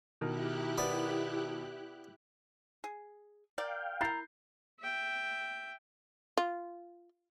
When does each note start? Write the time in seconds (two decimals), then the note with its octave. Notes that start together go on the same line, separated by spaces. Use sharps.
0.21 B2 D#3 E4 G4 A#4 F#6
0.78 B3 D5
2.84 G#4
3.58 A#4 D5 F5 G5
4.01 E4 A#4 A#5 G6 A6 C7
4.80 E5 G5
6.37 F4